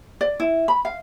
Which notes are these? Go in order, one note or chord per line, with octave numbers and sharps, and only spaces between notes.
D5
E4
B5
F5